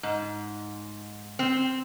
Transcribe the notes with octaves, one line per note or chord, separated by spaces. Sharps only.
G#2
C4